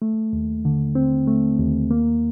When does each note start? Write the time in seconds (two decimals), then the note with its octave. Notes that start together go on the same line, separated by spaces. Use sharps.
0.02 A3
0.33 D#2
0.65 D3
0.95 C4
1.27 A3
1.59 D#2
1.91 A#3